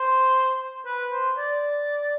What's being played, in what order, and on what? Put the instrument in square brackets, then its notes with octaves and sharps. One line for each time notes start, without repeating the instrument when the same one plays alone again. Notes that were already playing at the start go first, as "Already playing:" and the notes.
Already playing: [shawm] C5
B4
C5
D5